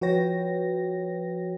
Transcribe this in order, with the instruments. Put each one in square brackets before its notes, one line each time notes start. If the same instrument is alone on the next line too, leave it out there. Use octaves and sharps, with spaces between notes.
[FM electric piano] F3 F#4 B4 C#5 G5 A#6